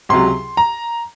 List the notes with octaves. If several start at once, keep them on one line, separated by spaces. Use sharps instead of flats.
C#2 C3 F#3 C6
A#5